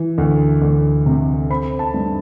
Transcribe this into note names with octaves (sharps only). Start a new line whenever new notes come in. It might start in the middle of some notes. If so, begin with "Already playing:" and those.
Already playing: E3
D2
D2
C3
C4 B5
A5
G2